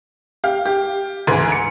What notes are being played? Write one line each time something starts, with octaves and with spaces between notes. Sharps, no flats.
G4 F5 F6
G4
D2 G#2 E3 G#5 C6
C#7